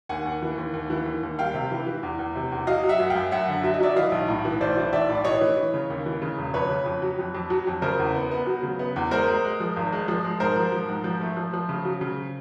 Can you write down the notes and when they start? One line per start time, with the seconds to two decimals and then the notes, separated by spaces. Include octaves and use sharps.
0.09 D#2 F#5 G#5
0.25 D#2
0.42 E3
0.58 D#2
0.74 D#2
0.90 E3
1.06 D#2
1.23 D#2
1.39 G3 F5 G5
1.54 C3
1.71 E3
1.86 E3
2.03 E2
2.19 E2
2.36 C3
2.52 E2
2.67 F#3 D#5 F5
2.83 F#3
2.89 E5 F#5
3.00 F#2
3.10 F#2 F5 G5
3.31 F#2 E5 F#5
3.48 D3
3.63 F#3 E5
3.74 D#5
3.80 F#3 D5 E5
3.96 E3 D#5 F5
4.12 B1
4.28 A2
4.45 E3
4.60 B1 C5 D5
4.77 E3
4.93 B1 D5 E5
5.10 A2
5.15 D5
5.24 E3 C#5 D#5
5.41 E3
5.57 E3
5.74 C#3
5.90 D#2
6.06 E3
6.22 C#3
6.38 E1
6.54 F2 B4 C#5
6.71 C#3
6.86 F2
7.02 F#3
7.19 F2
7.35 F2
7.50 F#3
7.67 F2
7.82 C#3 A#4 C5
7.99 E2
8.15 B3
8.31 B3
8.47 F#3
8.63 C#3
8.79 B3
8.96 E2
9.11 G#3 A#4 C5
9.28 G#3
9.44 G#3
9.60 F3
9.77 G#1
9.92 G#3
10.08 F3
10.24 G#3
10.40 G#2 A#4 C5
10.56 F3
10.72 F3
10.89 G#2
11.04 F3
11.21 A3
11.37 F3
11.54 F3
11.69 C#3
11.85 F#3
12.01 C#3